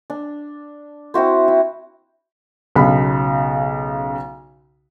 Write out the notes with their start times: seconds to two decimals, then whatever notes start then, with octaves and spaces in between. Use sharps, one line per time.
0.10 D4
1.14 C4 E4 F#4 C5
1.48 E4
2.76 B1 C#3 B5